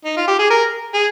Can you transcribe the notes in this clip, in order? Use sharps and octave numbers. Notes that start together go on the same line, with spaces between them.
D#4
F4
G4
G#4
A#4
G#4